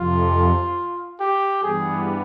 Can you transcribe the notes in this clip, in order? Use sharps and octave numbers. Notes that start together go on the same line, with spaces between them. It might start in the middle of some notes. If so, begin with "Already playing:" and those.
Already playing: F2 C3 F3 F4
G4
G2 E3 G3 B3 G#4